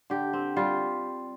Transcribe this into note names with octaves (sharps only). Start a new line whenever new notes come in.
D3 G4
C4
G3 F4